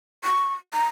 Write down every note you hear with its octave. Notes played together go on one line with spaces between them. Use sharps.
C#6
A#5